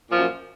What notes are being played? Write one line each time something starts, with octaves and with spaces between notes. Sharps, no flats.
F#2 A#2 F3